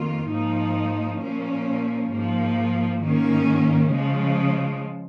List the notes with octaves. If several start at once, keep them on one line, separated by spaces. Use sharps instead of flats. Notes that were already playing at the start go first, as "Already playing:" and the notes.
Already playing: F2 D#3 A#3 F4
G#2 F3 A#3 D#4
A#2 F3 A#3 C#4
G#2 F3 A#3
G#2 D#3 A#3 C#4
C#3 F3 G#3